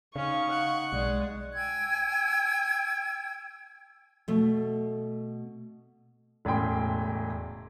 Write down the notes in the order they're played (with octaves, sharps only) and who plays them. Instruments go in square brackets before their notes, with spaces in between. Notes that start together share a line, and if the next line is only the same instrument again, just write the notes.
[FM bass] C#3 [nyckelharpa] C#4 [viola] D#4 C#6 [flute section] F5
[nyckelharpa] F#5
[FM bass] B1 [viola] G#3 [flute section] D5
[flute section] G5 G#5 E6 G#6
[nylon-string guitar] B2 A3
[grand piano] E1 A2 C#3 G#4 G5 C6